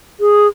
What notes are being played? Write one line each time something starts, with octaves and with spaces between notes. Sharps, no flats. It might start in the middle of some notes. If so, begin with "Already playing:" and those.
G#4